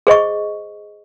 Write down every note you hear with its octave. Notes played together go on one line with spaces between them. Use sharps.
G#4 C5 D#5 C#6